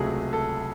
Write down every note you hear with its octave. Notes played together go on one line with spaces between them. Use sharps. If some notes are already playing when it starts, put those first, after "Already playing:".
Already playing: C#2 C3 F#3 A3 G#4
A4